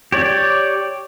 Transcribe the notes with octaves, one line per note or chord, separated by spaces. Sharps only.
G4 C#5 D5